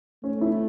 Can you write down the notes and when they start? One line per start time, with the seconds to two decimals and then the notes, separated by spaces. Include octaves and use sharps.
0.23 A3 C#4
0.41 E4